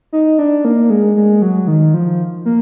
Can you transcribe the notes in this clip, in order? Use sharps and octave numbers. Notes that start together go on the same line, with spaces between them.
D#4
D4
A#3
G#3
G#3
F#3
D#3
F3
A#3